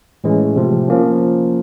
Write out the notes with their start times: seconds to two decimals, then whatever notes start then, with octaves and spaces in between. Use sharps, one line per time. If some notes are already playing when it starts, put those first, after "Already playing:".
0.24 A2 E3 G#3 C#4
0.56 C3 F3 A3
0.88 F3 A#3 C#4